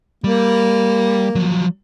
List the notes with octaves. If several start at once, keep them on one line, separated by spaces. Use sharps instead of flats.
G3 A#3
F3 F#3